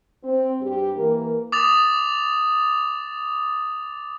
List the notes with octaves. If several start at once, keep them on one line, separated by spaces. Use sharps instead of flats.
C4
G2 G4
E3 A#3 A#4
D6 D#6 A6 F7